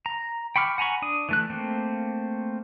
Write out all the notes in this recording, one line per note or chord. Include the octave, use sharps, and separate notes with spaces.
A#5
G5 B5 C#6 D6 F6
F#5 G#5 A#5 B5 C#6
D4 D#6
E3 A3 F#6
A3 A#3 C4